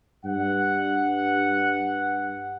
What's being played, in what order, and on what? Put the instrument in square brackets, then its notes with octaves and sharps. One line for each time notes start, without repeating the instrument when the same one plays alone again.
[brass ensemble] G2 F#5